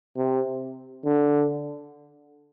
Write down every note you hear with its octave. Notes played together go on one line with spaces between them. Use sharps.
C3
D3